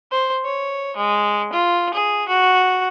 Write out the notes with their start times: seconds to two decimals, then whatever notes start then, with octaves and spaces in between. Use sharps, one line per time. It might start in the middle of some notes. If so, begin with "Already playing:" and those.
0.11 C5
0.45 C#5
0.96 G#3
1.53 F4
1.94 G#4
2.28 F#4